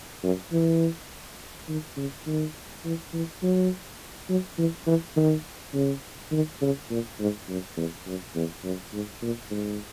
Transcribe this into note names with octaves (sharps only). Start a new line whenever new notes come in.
F#2
E3
D#3
C#3
D#3
E3
E3
F#3
F#3
E3
E3
D#3
C#3
D#3
C#3
A#2
G#2
F#2
E2
F#2
E2
F#2
G#2
A#2
G#2